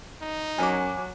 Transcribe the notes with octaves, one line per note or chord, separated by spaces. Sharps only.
D#4
F#2 F#3 G#5 D6